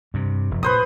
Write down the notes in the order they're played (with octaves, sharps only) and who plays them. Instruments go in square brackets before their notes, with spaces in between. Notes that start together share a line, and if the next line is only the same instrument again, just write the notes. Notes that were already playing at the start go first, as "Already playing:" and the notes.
[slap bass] G2 C3
F1
[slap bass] A#2 [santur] B4 C5 D#6